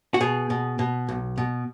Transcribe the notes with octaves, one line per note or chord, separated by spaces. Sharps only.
F#4
B2 G#4
B2
B2
B1
B2